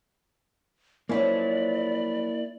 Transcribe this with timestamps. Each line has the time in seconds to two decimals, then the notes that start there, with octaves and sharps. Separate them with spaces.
1.09 F3 F#3 A#3 C#4 E4 D5